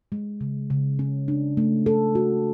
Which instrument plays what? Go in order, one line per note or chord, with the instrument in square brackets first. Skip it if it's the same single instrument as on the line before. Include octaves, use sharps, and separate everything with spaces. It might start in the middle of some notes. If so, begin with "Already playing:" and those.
[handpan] G#3
C#3
C#3
C#4
D4
A3
A4
F#4